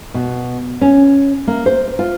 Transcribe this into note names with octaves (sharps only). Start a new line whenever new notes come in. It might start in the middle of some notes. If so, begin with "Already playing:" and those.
B2
C#4
A#3
C5
F4